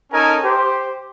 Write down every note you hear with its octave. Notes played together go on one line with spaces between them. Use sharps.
C#4 D#4 A4 A#4 G#5
G4 C5